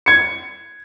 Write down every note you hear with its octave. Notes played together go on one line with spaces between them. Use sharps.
G#6 C#7